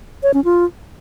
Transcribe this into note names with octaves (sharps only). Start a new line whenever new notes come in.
C#5
C#4
F4